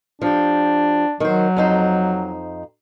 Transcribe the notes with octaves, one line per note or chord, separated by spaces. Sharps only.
F3 D4 G4
D#3 F#3 C5
F2 D#4 C5